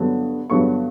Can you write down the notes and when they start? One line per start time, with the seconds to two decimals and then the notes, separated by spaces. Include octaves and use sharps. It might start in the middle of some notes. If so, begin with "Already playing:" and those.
Already playing: G2 D3 F#3 B3
0.50 G2 D3 F#3 B3 C#6